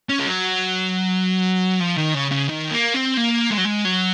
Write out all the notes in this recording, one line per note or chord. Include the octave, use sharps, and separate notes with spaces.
C#4
G#3
F#3
F3
D#3
C#3
C#3
D#3
A#3
C4
A#3
G#3
F#3
G#3
F#3